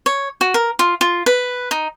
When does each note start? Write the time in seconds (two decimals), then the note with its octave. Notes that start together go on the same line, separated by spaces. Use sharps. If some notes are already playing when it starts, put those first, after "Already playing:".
0.06 C#5
0.41 F#4
0.54 A#4
0.79 F4
1.01 F4
1.26 B4
1.71 D#4